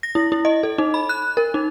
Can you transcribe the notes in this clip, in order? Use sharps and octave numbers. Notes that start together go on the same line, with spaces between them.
A#6
E4
E4
D#5
A4
D#4
B5
F#6
A#4
D#4